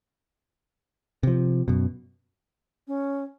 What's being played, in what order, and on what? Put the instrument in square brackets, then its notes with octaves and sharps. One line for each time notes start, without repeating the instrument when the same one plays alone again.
[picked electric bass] C3 F3
F#2 B2
[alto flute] C#4